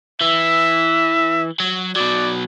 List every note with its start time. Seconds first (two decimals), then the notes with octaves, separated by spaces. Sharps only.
0.22 E3 E5
1.60 F#3
1.96 B2 F#3 D5